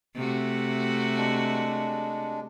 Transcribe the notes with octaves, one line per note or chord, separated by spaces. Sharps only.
C3 A3 F#4
G#3 D4